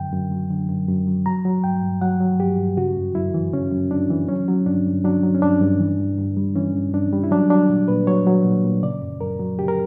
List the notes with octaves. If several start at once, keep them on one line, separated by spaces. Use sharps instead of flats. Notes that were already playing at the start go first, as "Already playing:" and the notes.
Already playing: F#2 D3 G5
F#2
F#3
D3
F#2
F#2
F#3
F#3 A#5
F#3
G2 G5
G2
F#3 F#5
F#3
G2 G4
G2
C#3 F#4
F#2
F#2 E4
E3
C#3 C#4
F#2
F#2 D4
E3
F#3 C#4
F#3
G2 D4
G2
F#3 D4
F#3
C#4
G2 D4
G2
E3
G2
G2
G3
E3 C#4
G2
G2 D4
G3
E4
F#3 D4
F#3 D4
A#2
A#2 B4
F#3 C#5
F#3
A#2
A#2
C#3 D5
F#2
F#2 A#4
F#3
C#3 G4
A#4